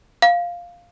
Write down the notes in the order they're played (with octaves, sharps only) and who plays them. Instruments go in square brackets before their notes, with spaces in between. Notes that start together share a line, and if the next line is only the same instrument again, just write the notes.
[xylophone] F5